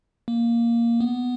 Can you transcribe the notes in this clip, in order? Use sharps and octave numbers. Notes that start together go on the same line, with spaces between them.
A#3
B3